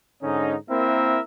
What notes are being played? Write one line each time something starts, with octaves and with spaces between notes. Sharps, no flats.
G#2 D3 C#4 D#4
A#3 C4 E4 A#4 E5